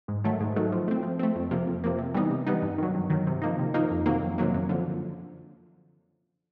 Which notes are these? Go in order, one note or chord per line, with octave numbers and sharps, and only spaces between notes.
G#2
D#3 F#3 A3
G#2
D#3 F#3 A3
F3
A3 C4
F3
A3 C4
F2
C3 F3 A#3
F2
C3 F3 A#3
C3
E3 G3 B3 D#4
C3
E3 G3 B3 D#4
G2
D#3 F#3
G2
D#3 F#3
C3
F3 A#3 D#4
C3
F3 A#3 D#4
F2
C3 D#3 F#3 A#3
F2
C3 D#3 F#3 A#3
F#2
D3 F3